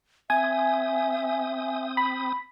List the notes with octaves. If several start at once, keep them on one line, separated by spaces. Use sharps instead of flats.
C4 E5 G#5 D#6
B5